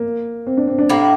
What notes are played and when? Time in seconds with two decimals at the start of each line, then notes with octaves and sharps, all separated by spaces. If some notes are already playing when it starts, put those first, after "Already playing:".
Already playing: A#3
0.47 C4
0.57 D4
0.67 C4
0.78 D4
0.89 A2 G3 A#3 E4